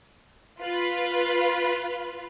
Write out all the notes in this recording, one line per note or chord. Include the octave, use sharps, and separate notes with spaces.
F4 B4